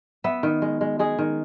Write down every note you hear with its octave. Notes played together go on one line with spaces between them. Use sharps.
B3 E5
D#3
G#3
G#3
G#3 G#4
D#3